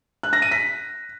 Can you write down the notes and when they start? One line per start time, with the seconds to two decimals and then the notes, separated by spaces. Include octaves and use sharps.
0.23 F#6
0.33 A#6
0.42 D#7
0.51 B6